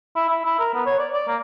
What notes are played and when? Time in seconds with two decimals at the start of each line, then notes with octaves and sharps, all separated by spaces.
0.16 E4
0.30 E4
0.45 E4
0.59 A#4
0.74 B3
0.86 C#5
0.99 D5
1.13 D5
1.28 A#3